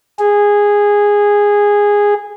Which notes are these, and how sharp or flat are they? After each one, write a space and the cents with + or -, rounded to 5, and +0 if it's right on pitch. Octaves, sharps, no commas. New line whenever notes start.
G#4 -15